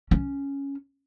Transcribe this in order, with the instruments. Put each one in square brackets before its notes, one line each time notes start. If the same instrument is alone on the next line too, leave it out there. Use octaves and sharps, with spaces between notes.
[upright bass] C#4